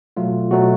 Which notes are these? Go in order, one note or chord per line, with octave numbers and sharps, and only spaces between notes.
B2 F#3 A3 F4
B2 F#3 A3 F#4